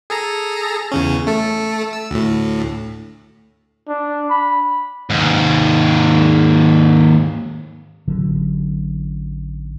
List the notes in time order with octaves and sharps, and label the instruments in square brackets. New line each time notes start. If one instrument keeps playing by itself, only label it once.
[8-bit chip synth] G#4 A4 A#5
E2 C#3 C#4
A3 A4
E6
D2 A2
[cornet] D4
B5
[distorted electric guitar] D#2 G#2
[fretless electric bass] A1 D3 F#3